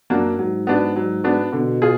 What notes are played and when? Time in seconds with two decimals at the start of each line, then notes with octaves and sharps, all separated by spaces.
0.10 F#2 F#3 A#3 D4 F#4
0.38 G#2 F#3
0.67 B3 D4 F#4
0.96 F#3
1.24 B3 D4 F#4
1.53 B2 D3
1.82 F4 G#4